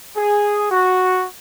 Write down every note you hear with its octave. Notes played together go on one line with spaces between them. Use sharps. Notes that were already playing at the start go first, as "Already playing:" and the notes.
G#4
F#4